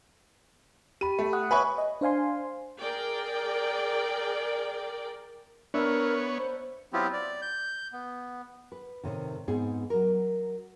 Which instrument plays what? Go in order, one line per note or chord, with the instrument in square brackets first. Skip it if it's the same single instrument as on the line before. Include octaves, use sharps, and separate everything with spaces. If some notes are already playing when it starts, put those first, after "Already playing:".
[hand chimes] G4 B5 [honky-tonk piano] D#7
[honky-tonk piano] A3
[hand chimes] F#5 D#6 F#6
[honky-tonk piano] B4 B5 C#6 [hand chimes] C#5 E5 G#5
[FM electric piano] D#5
D4 C5 F5 G#5 C6
[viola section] G#4 A#4 D5 G5
[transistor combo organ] B3 C#5 [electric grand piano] D4 E5 E6 [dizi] A#4
[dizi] C5
[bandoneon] F#3 B3 C4 E4 F4 G4
D5
G6
B3
[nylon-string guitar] B4
A2 C3 D#3
G#2 B3 C4 D#4 G#4
F#3 A#4